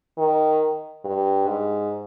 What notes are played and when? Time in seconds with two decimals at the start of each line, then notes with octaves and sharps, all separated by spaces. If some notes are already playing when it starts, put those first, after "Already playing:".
0.18 D#3
1.05 G2
1.48 G#2